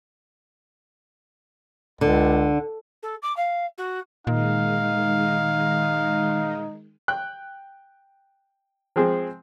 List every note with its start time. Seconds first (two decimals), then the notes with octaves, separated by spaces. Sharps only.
2.01 C#2 D3
3.02 A4
3.22 D6
3.37 F5
3.78 F#4
4.27 A#2 D#3 G#3 D#4 F5
7.08 G5 F#6
8.96 F3 G#3 C4 G#4